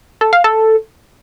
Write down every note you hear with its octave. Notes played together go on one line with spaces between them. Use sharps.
A4
F5
A4